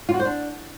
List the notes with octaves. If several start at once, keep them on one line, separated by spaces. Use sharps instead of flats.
F4
F#4
C5
D4